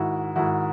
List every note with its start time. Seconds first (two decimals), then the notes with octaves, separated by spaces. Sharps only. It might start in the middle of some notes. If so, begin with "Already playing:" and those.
Already playing: G#2 D#3 E4 F#4
0.36 G#2 D#3 E4 F#4